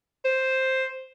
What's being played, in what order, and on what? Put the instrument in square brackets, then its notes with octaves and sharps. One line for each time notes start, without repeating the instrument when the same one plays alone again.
[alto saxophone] C5